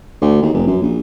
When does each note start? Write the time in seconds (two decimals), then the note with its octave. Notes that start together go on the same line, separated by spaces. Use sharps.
0.21 D2
0.42 D#2
0.54 F1
0.67 F#2
0.82 A#1